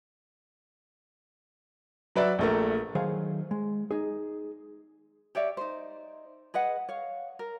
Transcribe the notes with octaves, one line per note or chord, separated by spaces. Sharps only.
F#3 B4 D5 E5
A#1 A3 A#4
D#3 F#3 G#4 C5 F5
G#3
D#4 G#4
G4 C#5 D5 E5
D#4 C5
G#4 B4 D#5 F#5
C#5 F5
A#4